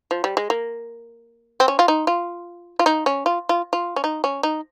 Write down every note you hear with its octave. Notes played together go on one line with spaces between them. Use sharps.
F3
G3
G#3
A#3
C4
C#4
F4
D#4
F4
F4
D#4
C#4
F4
F4
F4
C#4
D#4
C#4
D#4